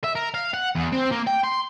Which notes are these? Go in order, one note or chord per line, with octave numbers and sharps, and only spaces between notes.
E5
A#4
F5
F#5
E2
C4
A#3
G5
C6